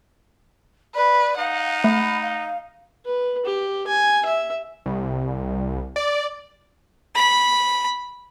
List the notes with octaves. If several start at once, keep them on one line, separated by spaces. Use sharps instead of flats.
B4 D5
D#4 F5 F#5
A3 B5
F5
B4
G4
G#5
E5
C2
D5
B5